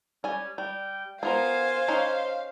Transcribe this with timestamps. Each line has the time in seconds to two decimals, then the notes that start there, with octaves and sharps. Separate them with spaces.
0.24 G3 C#4 G#5
0.58 G3 G5
1.23 B3 F4 A#4 C5 F5 G#5
1.88 C#4 D#4 G4